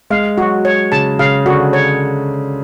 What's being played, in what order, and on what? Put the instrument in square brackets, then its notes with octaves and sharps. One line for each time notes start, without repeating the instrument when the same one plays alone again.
[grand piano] G#3 [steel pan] F5
[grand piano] F#3 [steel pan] F#4
[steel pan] C#5
[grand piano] C#3 [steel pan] A5
[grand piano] C#3 [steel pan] F5
[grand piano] D3 [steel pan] F#4
[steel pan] C#5